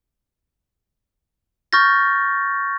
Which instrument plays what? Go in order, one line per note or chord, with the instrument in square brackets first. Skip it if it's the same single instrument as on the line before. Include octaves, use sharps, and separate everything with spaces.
[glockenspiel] C#6 F6 G6 A6 A#6